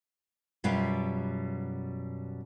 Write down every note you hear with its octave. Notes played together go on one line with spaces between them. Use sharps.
F#2 B2 G3 B3 F4 G4